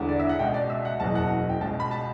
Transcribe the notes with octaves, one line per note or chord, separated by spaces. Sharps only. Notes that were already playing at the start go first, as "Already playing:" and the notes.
Already playing: E1 E2 D3
D5
E5
F#5
C#2 B2 G5
D5
E5
F#5
F#1 E2 B2 A5
F#5
G5
C#2 B2 A5
B5
A5